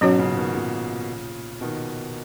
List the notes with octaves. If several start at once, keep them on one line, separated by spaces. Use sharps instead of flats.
G#2 B2 F#3 C#4 F#4 C#5
A#2 C#3
B2 D#3
A#2 C#3
B2 D#3